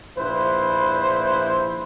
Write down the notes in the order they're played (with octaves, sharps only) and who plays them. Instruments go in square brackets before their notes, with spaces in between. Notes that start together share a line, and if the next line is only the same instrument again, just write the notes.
[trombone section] A#1 E4 B4 C5